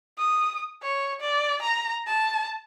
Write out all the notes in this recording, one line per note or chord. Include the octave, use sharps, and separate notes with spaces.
D#6
C#5
D5
A#5
A5